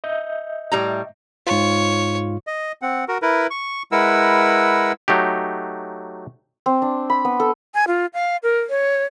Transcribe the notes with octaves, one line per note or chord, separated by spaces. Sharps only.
D#5 E5 G6
A2 G3 A#5
G#2 F4 C#5
D#5
C4 F#5
F#4 A#4
E4 A#4 B4
C#6
G#3 E4 A#4 B4 F#5 E6
F#3 A3 D#4 G4
C4
D4
B5
B3
A4
G#5
F4
F5
A#4
C#5